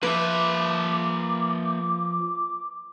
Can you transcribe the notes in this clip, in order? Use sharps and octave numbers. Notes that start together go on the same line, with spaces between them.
F3 A#3 B4 E5 D6